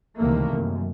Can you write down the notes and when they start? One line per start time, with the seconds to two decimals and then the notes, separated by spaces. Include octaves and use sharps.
0.18 C#2 C3 D#3 E3 A3 A#3
0.55 F#2